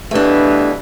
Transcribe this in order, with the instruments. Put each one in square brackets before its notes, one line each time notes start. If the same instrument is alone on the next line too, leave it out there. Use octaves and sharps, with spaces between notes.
[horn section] G2 B2 E3 [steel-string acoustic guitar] A3 D4